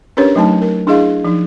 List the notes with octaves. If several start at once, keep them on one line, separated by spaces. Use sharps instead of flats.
C#4 D4 G4 A#4 B4 C#5
F#3 A3 D#4 A5
A#4
D4 E4 G#4 D#5 F5
F3 D#4